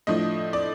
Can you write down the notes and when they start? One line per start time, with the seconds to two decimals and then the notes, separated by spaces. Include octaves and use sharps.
0.07 A2 F3 A3 D4 D#5
0.53 D5